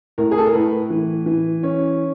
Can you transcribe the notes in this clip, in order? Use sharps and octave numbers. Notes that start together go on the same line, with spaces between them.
A2 A#4
G#4
A4
A#4
A2 B4
E3
E3
C#4